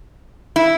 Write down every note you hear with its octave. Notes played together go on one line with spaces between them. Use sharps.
E4